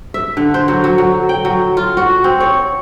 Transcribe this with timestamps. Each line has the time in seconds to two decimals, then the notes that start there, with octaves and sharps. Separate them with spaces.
0.14 E5
0.37 D3
0.54 C5
0.68 F#3
0.84 F#3
0.98 F#3
1.29 G5
1.45 F#3
1.77 F4
1.97 F#4
2.24 C4
2.40 C#5